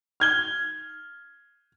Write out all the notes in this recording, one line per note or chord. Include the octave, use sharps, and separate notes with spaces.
F6 G#6 G7